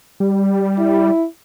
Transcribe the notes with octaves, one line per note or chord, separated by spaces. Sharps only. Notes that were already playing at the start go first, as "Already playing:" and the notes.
G3
E4